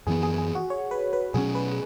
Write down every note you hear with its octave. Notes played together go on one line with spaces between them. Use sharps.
F#2 E3 B3 G#4
G#4
G#4
F#4
C#5
B4
B4
B2 F#3 C#4 G#4
B4